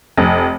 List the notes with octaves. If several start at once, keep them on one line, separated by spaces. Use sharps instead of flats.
F1